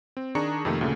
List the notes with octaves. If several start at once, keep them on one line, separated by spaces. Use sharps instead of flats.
C4
D#3 D4 G#4 A#5 C#6 C#7
F2 C3 D#3 A3 A#3
D2 A#2 C#3 A3